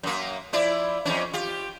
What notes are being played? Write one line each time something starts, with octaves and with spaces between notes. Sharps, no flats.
F#2 A#3
F3 E4 D5
F2 E3 C#4
F4 G4